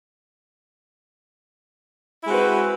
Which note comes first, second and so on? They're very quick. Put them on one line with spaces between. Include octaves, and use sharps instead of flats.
E4 G#3 C4 F#4 B4